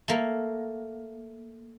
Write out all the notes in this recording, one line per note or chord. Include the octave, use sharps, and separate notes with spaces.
A3 A#3